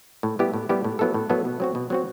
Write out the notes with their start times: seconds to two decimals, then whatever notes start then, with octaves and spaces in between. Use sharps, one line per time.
0.23 A2
0.39 G3 B3 E4 G4
0.54 A2
0.69 G3 B3 E4 G4
0.84 A2
0.99 F#3 B3 E4 A4
1.14 A2
1.30 F#3 B3 E4 A4
1.45 B2
1.60 F#3 C4 F#4
1.75 B2
1.90 F#3 C4 F#4